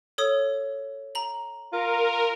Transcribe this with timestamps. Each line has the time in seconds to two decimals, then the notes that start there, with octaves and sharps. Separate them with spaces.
0.18 A4 C#5 D#6
1.15 A#5 F#7
1.73 F4 A#4